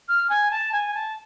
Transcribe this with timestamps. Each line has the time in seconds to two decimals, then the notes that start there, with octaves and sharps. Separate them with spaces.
0.08 F6
0.30 G#5
0.51 A5
0.73 G#5
0.94 A5